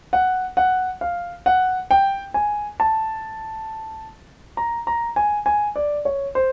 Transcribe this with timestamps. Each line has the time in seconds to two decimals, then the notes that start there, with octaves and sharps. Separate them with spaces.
0.13 F#5
0.57 F#5
1.01 F5
1.46 F#5
1.91 G5
2.34 G#5
2.80 A5
4.57 A#5
4.87 A#5
5.16 G#5
5.46 G#5
5.76 D5
6.05 C#5
6.35 C5